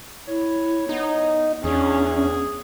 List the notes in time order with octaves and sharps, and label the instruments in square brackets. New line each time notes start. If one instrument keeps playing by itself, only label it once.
[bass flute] E4 [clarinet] C#5
[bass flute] B3 [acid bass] D#4
[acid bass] E2 [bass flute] B3 [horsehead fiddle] C#4 D4 [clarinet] G#4